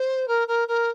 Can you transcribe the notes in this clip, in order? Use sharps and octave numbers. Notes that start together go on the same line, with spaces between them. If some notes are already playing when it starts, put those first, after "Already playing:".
Already playing: C5
A#4
A#4
A#4